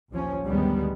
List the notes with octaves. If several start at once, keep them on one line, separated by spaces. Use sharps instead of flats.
A#1 D#2 F3 C#4
D2 G2 D#3 G3 G#3 B3